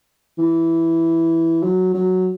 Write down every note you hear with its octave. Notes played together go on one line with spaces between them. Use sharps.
E3
F#3
F#3